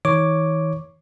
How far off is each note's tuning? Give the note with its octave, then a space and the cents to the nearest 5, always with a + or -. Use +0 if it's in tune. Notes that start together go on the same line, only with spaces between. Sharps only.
E3 -45 C#5 +0 D6 +0